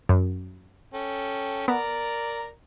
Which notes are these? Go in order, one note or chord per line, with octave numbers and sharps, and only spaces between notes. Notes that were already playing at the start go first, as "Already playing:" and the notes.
F#2
C#4 A4 G5
B3 A#4 D5 A#5